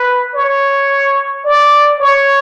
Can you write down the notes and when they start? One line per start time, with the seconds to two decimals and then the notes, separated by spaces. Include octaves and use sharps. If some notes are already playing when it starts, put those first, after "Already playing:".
Already playing: B4
0.35 C#5
1.45 D5
2.00 C#5